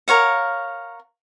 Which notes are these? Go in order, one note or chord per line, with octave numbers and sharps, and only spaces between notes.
A#4 C#5 F5 F#5